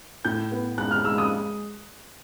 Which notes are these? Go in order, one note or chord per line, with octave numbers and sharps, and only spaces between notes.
A2 G6
B3
G#3 F#6
F6
G#3 E6
D#6